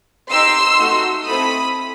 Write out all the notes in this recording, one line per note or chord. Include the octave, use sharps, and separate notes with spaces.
D#4 G4 C6 E6
A3 D#4 F#4
A3 C4 E4 A4 B5 D#6